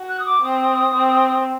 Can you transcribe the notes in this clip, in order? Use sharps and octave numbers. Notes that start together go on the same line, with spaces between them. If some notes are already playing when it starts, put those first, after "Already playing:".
Already playing: F#4
F#6
D#6
D6
C4 D#6
C4